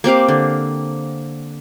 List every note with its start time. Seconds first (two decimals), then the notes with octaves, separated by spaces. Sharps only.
0.04 A#3 C4 G4 F5
0.28 D3